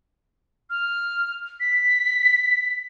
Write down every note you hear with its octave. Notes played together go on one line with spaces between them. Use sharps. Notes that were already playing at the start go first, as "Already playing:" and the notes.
F6
B6